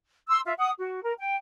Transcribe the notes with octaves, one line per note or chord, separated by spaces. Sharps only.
C6 E6
F4 E5
F#5 D#6
F#4
A#4
G5